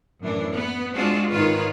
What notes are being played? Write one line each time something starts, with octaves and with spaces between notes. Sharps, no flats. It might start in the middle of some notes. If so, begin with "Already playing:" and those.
F#2 A2 E3 D4
B3
G#3 C4 D4 F4 F#4
G#2 D#3 F4 B4 C#5